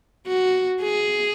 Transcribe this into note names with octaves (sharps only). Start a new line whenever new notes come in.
F#4
G#4